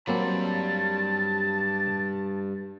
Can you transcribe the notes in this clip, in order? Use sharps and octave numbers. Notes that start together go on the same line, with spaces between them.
G2 F#3 A#3 C4 A5 B5